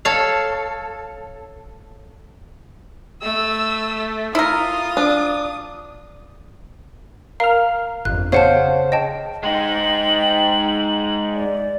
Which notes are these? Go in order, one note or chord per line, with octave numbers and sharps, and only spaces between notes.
A4 C#5 F5
A3 E6
E4 F4 A#4 D#6
D4
A#4 F5 F6
G1 F2 F#6
C#3 C5 F5 F#5 A5
D#5 G5 A5
G#3 D#4 G5 F#7
D5